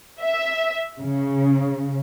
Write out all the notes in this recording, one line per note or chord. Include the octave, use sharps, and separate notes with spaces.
E5
C#3